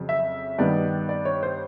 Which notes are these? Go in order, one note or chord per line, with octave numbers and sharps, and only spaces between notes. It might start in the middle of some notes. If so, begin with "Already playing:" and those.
Already playing: F2 C#3 F#3
E5
G2 D#3 G3 B3 D5
D5
C#5
C5